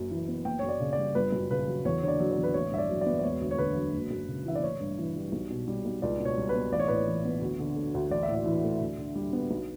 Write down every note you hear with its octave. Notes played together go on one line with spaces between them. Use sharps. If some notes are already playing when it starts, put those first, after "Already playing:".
Already playing: F#1 F#2
E3
B3
F#1 G5
F#2 C#5
D5
C#3
D5
G3
G1 B4
F#2
C#3 B4
F#3
E2 C#5
D3 C#5
D5
F#3
D5
E2
B4
A1 C#5
G2 E5
D5
F#3
B3 D5
D5
E1 C#5
D2
C#5
D3 B4
F#3
F#1
F#2
C#3
E3 E5
D5
A1 C#5
G2
E3
G3
B1
B2
G3
B1
C#2 D5
B2
C#5
G3
B4
B3
A1 D5
C#5
A2 B4
C#5
E3
B3
D2
D3
A3
D2
A1 D5
E5
A2
D5
E3
A3
D2
D3
G3
B3
B1